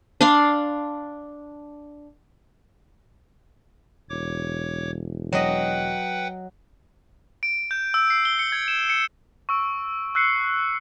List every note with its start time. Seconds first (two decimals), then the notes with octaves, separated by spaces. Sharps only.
0.21 D4 D5 F5 C6
4.10 E1 C#5 D6
5.33 F#3 B4 D#5 F#5 G5
7.43 D7
7.71 G6
7.94 E6
8.10 C7
8.25 G7
8.39 C#7
8.52 G#6
8.68 E7
8.90 C#7
9.49 C#6 E6 D7
10.15 E6 F#6 C7 C#7